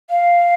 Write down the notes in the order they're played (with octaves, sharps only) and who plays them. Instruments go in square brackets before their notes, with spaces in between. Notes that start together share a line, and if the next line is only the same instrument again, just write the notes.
[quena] F5